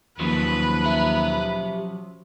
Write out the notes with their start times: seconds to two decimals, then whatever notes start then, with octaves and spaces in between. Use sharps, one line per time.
0.19 D#2 F3 F#3 C#4 B4
0.85 G4 E5